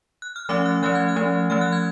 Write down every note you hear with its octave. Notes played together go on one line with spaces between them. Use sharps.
F#6
F6
F3 A3 C#4 D6
F#6
F3 A3 C#4 F#6
G#6
F#6
F3 A3 C#4
F3 A3 C#4 F6
F#6
G#6